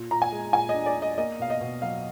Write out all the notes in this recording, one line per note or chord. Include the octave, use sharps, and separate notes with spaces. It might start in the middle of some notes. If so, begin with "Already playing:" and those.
Already playing: A#2
A#2 A#5
G#5
G#3
A#2 G#5
D#5
D4
D5
D4
D#5
A#3 D#5
B2 F5
D#5
B2
F#3 F5